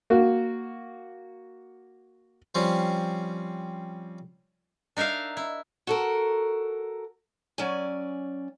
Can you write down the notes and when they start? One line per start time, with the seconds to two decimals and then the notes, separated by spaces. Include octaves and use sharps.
0.10 A#3 F#4
2.55 F3 G3 C4 C#4
4.97 D4 D#4 A#4 E5 F5
5.37 E4
5.87 F#4 A4 A#4
7.58 F#3 C#4 D5 G#5